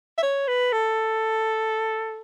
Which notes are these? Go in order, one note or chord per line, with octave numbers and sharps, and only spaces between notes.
E5
C#5
B4
A4